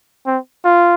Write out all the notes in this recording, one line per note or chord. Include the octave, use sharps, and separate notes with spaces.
C4
F4